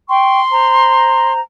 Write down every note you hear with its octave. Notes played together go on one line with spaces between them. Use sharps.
G5 C6 C#6
C5 A#5